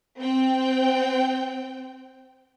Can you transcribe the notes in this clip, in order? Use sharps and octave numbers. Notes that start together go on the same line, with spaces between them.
C4 G5